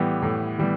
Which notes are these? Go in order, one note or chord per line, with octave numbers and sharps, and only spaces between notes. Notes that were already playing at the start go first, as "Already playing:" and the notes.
Already playing: A2 E3 G3 B3 G4
A2
E3 G3 B3